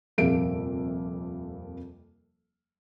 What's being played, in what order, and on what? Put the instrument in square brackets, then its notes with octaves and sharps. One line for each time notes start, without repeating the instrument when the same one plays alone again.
[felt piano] D#1 F2 C3 A#3 E5 D7